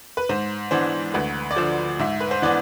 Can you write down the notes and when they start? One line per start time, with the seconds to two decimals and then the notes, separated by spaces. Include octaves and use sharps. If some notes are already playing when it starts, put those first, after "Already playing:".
0.17 B4
0.29 G#2 C5
0.71 E3 B3 D4 C5
1.14 D2 B4
1.51 D5
1.56 D3 F3 C5
1.99 G#2 E5
2.20 B4
2.31 C5
2.42 E3 B3 D4 D5